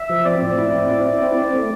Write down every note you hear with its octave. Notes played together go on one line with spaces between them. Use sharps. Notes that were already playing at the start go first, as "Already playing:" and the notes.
Already playing: E5
F3
C4 D5
A2
E4
C4
E4
E4
C4
C4
A3